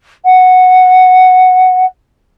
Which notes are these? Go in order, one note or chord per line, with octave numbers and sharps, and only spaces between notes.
F#5